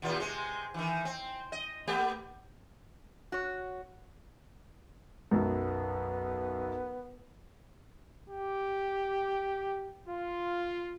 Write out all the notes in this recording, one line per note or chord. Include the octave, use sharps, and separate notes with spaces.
D#2 A#2 F4
C3 G#3
D#3 E3
C4
D#5
A3 B3 G4
F#4 C#5
B1 F#2 B3
G4
F4